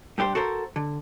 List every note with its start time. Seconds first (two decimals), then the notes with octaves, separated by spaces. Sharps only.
0.18 G2 G3 G4 A#4 C5
0.35 F#4 A4 A#4 C5
0.76 D3